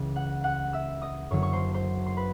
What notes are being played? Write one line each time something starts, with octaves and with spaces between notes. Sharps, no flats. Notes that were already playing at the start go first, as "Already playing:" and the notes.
Already playing: C#2 C#3 E3
F#5 F#6
F#5 F#6
E5 E6
D#5 D#6
F#1 F#2 D3 F#3 A#3 C#5 C#6
C#6
C5 C6
C5 C6
C6
B4 B5